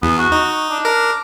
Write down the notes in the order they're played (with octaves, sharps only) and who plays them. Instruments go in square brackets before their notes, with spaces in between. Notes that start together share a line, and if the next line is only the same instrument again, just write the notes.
[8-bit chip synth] E2 [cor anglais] B3
[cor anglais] F#4
[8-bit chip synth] D#4
[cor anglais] D4
[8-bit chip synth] A#4